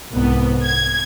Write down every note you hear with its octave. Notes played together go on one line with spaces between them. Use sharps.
C2 G#2 B3
G#6